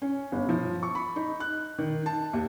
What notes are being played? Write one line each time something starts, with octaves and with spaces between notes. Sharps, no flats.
C#4
G1
F3
C#6
B5
D#4
F#6
D#3
A5
D#2